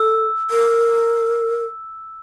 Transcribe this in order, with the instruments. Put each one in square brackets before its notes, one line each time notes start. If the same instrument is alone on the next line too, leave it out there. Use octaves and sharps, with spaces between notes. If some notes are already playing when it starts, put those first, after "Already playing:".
Already playing: [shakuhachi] A4 [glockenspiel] E6
[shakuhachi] A#4